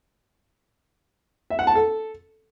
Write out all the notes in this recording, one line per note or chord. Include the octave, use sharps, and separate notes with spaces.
E5
F#5
A5
A4